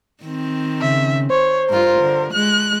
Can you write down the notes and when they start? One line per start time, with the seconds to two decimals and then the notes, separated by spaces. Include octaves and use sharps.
0.23 D#3 C4
0.81 C#3 E5
1.30 C5 C#5
1.70 G2 F4 A#4
2.00 D3
2.33 G#3 F#6